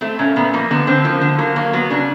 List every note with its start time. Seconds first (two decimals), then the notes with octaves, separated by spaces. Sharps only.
0.01 A3 C4
0.19 A#2 C#4
0.36 A#2 B3
0.53 F3 A#3
0.71 D3 B3
0.87 D3 C4
1.04 F3 A#3
1.21 D3
1.38 F#3 A#3
1.56 F#3 A#3
1.73 F#3 B3
1.90 C#3 D4